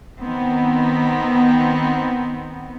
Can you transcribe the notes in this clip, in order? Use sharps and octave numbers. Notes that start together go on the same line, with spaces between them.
D#3 B3 C4